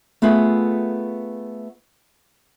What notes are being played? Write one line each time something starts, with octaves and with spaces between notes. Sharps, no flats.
A3 B3 F4 G#4 A4